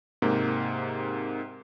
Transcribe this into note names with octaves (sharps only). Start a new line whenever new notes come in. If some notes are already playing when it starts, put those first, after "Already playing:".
G#2 C3 A#3